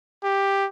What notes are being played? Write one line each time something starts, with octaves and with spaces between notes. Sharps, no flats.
G4